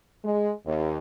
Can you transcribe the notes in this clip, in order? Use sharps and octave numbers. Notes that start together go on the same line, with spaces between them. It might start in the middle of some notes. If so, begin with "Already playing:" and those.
G#3
D#2